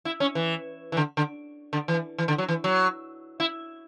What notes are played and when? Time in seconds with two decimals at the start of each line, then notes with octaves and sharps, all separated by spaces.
0.05 E4
0.20 C#4
0.35 E3
0.92 E3
0.97 D3
1.17 D3
1.73 D3
1.88 E3
2.18 E3
2.28 D3
2.38 F#3
2.48 E3
2.64 F#3
3.40 E4